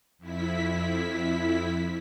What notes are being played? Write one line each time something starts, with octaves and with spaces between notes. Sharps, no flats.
F2 E4 B6